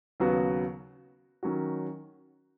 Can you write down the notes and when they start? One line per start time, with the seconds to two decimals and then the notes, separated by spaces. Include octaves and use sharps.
0.20 D#2 C#3 F#3 B3 F#4
1.43 D#3 F#3 C#4 F#4